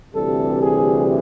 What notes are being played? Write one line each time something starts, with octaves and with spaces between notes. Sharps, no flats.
D2 C3 E3 G3 A4
G#4